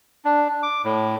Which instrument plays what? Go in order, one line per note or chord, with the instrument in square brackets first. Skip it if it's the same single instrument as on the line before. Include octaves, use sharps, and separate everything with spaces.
[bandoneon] D4
D6
A2